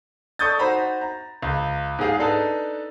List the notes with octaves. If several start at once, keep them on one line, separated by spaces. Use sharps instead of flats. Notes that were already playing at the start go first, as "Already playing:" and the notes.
A4 D5 C#6 D#6 G6 A6
D#4 F#4 C5 A#5 B5
A#5
C#2
G#2 G4 G#4 F5
D4 D#4 A4 B4